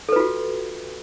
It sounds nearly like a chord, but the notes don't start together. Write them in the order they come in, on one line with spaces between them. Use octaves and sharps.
A4 B4 F4 F#4